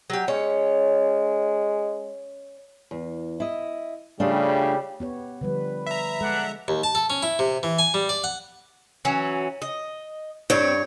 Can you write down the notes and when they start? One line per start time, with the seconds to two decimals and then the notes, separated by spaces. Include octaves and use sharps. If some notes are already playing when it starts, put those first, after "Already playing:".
0.10 F#3 G4
0.28 G#3 C#4 C#5
2.91 E2
3.40 E4 D#5
4.20 C#3 G3 A3 D4 F4
5.00 B3 G4 C#5
5.41 D3 F3 G3 B4
5.87 E5 A#5
6.21 G#3 D4 A4 F#5
6.68 D#2
6.83 A5
6.95 A4
7.10 C#4
7.23 E4
7.39 C3
7.63 E3
7.79 G#5
7.94 G3
8.09 D5
8.24 F#5
9.05 E3 F#3 C#4
9.62 D#5
10.50 G2 C4 C#5